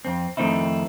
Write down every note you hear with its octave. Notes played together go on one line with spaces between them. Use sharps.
F2 C4
F2 D#3 A3 C4 D#4 E4